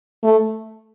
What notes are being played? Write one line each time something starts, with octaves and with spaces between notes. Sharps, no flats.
A3